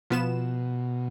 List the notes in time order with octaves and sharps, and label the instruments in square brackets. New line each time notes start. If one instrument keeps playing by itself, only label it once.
[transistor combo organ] B2 [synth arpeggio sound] F3 B3 E7